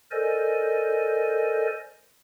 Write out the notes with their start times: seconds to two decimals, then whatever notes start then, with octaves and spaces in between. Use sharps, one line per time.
0.11 A4 A#4 C5 D5 D#5 G#5